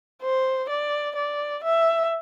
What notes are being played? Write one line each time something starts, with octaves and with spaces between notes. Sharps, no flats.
C5
D5
D5
E5